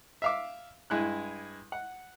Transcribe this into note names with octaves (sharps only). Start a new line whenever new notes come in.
E5 F5 D6
G2 G#3 E4 F#6
F#5